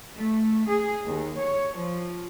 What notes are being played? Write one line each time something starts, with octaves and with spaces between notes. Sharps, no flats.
A3
G#4
D#2
C#5
F3